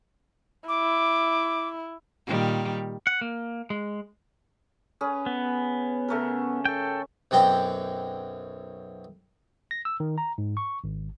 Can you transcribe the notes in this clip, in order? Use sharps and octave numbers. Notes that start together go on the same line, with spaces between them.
E4 D6
A#2 D#3 G3
F#5
A#3
G#3
C#4 G#4 B4
B3
C#3 A3 A#4
A4 G5 C#6
B1 F#2 C4 G5 A#5
A#6
E6
D#3
A#5
G#2
C#6
G#1